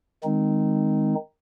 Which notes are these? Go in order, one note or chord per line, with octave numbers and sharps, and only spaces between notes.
D#3 G#3 C4 D#4